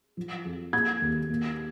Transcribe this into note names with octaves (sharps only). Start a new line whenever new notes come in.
F3
F2
A#3 G#6
D#2
A#3